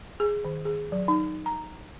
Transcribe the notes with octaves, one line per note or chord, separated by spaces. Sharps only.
G#4
D#3
G#4
F#3
D#4
A#5